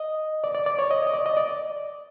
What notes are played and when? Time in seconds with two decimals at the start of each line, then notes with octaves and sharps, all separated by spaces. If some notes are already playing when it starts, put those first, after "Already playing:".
Already playing: D#5
0.44 D5
0.55 D5
0.66 D5
0.79 C#5
0.91 D#5
1.07 D#5
1.14 D5
1.26 D#5
1.37 D5